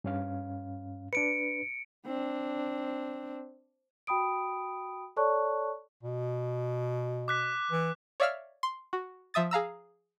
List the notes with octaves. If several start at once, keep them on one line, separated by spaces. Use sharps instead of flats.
G2 C#4 F5
D4 B4 C#7 D7
C4 D4
F#4 G5 B5 D#6 D7
A4 C#5 D5 A5 C#6 F#6
B2
D6 F#6 B6
E3
C#5 D5 E5 F5 E6 F6
C6
F#4
F3 E5 D#6 A6
G#4 F5 A#5 E6